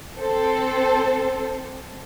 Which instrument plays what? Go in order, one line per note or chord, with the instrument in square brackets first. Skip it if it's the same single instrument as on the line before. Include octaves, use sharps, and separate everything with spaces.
[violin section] C4 A4 C5